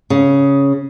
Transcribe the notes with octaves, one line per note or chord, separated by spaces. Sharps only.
C#3